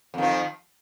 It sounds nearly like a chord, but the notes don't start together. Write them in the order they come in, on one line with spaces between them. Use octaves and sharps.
F2 D#3 F3